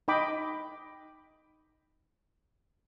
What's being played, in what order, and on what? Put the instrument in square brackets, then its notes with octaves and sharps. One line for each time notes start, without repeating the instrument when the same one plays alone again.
[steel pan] D#4 D#5 G5 B5 D6